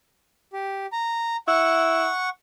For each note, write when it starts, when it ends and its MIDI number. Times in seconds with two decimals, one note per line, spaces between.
0.53 0.86 67
0.93 1.37 82
1.48 2.09 64
1.48 2.29 78
1.48 2.29 85